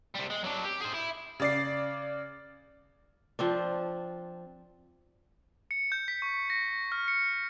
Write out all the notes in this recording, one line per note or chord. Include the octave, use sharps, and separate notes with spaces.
C3 G3
G#3
F#3 D4
G4
G#4 C5
E4
C#3 D5 C7
F3 C4 D4
C#7
G6
B6
C#6
A#6
F6
C#7